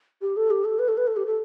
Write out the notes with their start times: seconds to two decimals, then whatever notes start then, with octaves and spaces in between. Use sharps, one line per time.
0.22 G4
0.36 A4
0.51 G4
0.65 A4
0.79 B4
0.88 A4
0.97 B4
1.07 A4
1.16 G4
1.26 A4